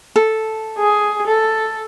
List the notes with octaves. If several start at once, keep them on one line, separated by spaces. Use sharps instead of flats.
A4
G#4
A4